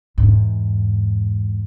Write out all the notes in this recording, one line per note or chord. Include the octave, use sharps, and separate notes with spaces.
E2 G#2